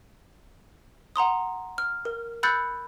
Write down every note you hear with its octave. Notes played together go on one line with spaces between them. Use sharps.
F#5 A#5 C6 D#6
F6
A#4
B5 E6 F#6 G6 A6 C#7